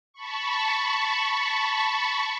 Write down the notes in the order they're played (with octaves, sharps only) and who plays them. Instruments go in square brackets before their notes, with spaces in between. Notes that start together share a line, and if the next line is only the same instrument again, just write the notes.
[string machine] A5 B5 C#6